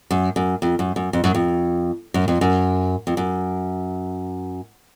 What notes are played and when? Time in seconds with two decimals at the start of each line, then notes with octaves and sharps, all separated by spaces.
0.11 F#2
0.36 F#2
0.62 F2
0.79 F#2
0.96 F#2
1.13 F2
1.24 F#2
1.35 F2
2.14 F#2
2.28 F2
2.41 F#2
3.07 F2
3.17 F#2